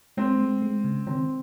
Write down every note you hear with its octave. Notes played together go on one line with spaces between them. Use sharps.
G#3 C4
G#3
G#3
C#3
D#3 C4